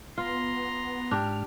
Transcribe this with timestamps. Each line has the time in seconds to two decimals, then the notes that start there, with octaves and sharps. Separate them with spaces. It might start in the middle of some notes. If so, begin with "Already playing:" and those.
0.18 B3 F4 A#5 C6
1.11 G#2 D4 G4 F6